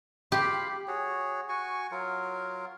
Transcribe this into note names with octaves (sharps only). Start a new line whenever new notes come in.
F4 G4 F5 B5
F#4 G#4 C#5
F#4 G#5 C#6
F#3 F4 A#4